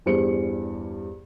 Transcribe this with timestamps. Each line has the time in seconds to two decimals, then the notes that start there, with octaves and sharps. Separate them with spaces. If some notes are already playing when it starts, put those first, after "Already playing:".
0.06 E2 G2 C5 C#7